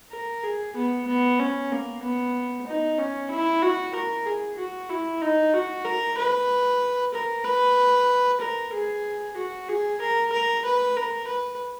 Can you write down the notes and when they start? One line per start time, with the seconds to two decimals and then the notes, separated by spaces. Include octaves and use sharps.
0.11 A#4
0.43 G#4
0.76 B3
1.07 B3
1.39 C#4
1.71 A#3
2.02 B3
2.67 D#4
2.98 C#4
3.30 E4
3.62 F#4
3.95 A#4
4.26 G#4
4.58 F#4
4.89 E4
5.22 D#4
5.53 F#4
5.85 A#4
6.18 B4
7.14 A#4
7.45 B4
8.41 A#4
8.73 G#4
9.37 F#4
9.69 G#4
10.01 A#4
10.32 A#4
10.65 B4
10.97 A#4
11.28 B4